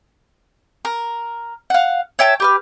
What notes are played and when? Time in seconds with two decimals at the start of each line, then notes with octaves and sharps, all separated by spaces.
0.85 A#4
1.70 F5 F#5
2.19 C#5 E5 G5 A5
2.40 G4 B4 F6